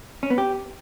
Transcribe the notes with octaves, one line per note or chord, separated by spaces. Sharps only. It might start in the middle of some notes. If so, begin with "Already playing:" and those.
C#4
B3
G4